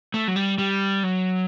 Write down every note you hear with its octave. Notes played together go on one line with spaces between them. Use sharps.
A3
F#3
G3
G3
F#3